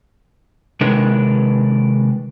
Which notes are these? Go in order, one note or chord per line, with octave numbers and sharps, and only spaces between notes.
C3 D#3 G#3 D4 A#4 B4